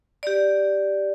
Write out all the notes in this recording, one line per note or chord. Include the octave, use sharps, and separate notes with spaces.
G4 D5